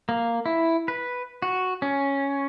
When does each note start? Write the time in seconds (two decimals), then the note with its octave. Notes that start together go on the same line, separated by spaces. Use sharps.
0.09 A#3
0.46 E4
0.88 B4
1.42 F#4
1.82 C#4